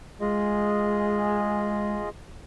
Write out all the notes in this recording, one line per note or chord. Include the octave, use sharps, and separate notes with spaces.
G#3 F4 G#4 D#5